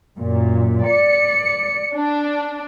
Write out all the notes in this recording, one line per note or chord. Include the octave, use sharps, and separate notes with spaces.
F#2 A#2
D5 C#7
D4